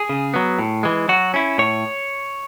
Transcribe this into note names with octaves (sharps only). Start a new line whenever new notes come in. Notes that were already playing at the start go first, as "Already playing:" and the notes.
Already playing: G#4
C#3
F#3 B3
A2
E3 G#3
F#3 F#4
C#4 E4
A2 C#5